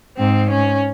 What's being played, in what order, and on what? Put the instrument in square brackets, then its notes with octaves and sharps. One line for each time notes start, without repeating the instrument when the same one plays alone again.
[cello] G#2 [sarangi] C4
[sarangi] C#4